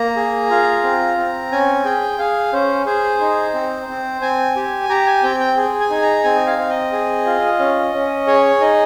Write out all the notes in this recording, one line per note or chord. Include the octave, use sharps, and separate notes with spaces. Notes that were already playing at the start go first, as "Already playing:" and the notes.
Already playing: A#3 A#5
G#4
F4
C4
C4
C#4 G#5
G#4 G5
G#4 F5
C#4 C5
G#4 C5
D#4
C4
C4
C4 G#5
G4
G4 A#5
G#5
C4 G5
G5
G#4
G#5
D#4
A#5
C4 G#5
F5
C4
D#5
G#4
F4
C#4
C#4
G#4 C#5
D#4 D#5